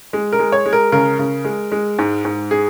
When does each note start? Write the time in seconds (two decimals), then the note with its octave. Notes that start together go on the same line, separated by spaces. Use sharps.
0.13 G#3
0.33 A#4
0.39 G#3
0.52 C#5
0.66 G#3
0.73 A#4
0.92 C#3 A#4
1.19 C#3
1.45 G#3
1.72 G#3
1.99 G#2
2.25 G#2
2.51 G#4